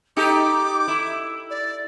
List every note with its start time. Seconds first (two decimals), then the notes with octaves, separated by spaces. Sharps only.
0.17 D#4 G4 A4 D6
0.88 E4
1.50 D5